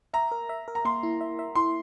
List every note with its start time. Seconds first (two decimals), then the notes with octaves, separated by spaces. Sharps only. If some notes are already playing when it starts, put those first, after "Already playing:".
0.13 E5 A#5
0.32 A#4
0.49 E5
0.68 A#4
0.75 A#5
0.85 A#3 C6
1.03 E4
1.21 E5
1.39 E5
1.55 E4 C6